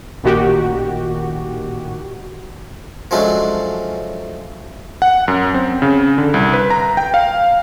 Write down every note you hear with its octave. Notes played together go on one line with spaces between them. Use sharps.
A1 A#2 D#3 F#4 G4
F3 F#3 G#3 A3 C#4 D4
F#5
F#2
C4
C#3
D3
C2
B4
A#5
G5
F5